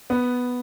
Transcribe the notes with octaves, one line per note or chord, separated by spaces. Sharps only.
B3